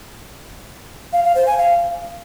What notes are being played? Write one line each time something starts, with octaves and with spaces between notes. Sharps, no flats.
F5
F5
C5
G#5
F5